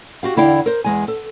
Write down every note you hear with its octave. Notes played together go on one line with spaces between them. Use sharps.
F#4 G4 F5
E2 D3 E4 D5 F5 G5
A#4 C5
E2 G#3 G#5
A4